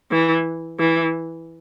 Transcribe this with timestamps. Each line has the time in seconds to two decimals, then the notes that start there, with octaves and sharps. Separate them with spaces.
0.11 E3
0.79 E3